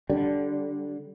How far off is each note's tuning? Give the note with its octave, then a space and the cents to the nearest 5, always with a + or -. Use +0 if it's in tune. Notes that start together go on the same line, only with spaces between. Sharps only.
D3 -10 G3 -20